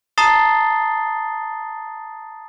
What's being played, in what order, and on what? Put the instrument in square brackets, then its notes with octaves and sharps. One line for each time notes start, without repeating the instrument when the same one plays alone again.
[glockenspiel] A5 A#5 D#6 A6 C7 G7